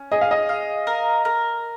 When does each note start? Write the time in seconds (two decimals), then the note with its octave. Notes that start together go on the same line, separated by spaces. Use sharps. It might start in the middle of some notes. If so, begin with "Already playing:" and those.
Already playing: C#4
0.12 G#4 D#5
0.21 F5
0.31 D#5
0.49 F5
0.87 A#4
1.25 A#4